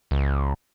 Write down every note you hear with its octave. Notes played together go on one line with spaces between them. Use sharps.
C#2